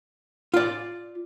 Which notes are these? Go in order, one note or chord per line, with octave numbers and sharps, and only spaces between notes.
F4 D5